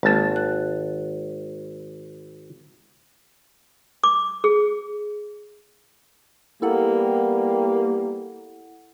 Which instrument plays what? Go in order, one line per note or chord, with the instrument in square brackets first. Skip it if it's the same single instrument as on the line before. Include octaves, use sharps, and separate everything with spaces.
[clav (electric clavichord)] G#1 A5 [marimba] G#3 A#3
[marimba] F#6
[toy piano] D6
G#4
[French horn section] G3 B3 G4 [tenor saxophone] A#3 [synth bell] E4 A4 F#5